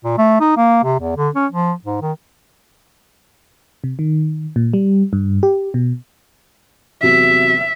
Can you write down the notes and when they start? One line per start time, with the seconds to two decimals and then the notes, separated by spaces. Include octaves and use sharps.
0.05 A#2
0.18 A3
0.40 D#4
0.57 A#3
0.84 C3
1.00 E2
1.17 D3
1.35 C#4
1.52 F3
1.84 G#2
2.02 D#3
3.84 C3
3.99 D#3
4.56 A#2
4.74 G3
5.13 G2
5.43 G4
5.74 B2
7.03 E2 C3 F#3 E5